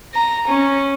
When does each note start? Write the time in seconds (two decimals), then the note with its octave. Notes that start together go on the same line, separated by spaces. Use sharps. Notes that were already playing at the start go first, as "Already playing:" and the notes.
0.15 A#5
0.48 C#4